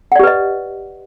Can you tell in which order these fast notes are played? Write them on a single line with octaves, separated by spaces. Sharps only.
F#5 D5 G4 B4 D#5